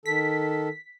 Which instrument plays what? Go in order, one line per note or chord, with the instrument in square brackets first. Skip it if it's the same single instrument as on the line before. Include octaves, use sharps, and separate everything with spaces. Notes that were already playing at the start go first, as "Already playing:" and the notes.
[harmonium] D#3 A4 [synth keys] B6